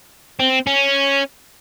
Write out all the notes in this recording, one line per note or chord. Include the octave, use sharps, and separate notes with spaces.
C4
C#4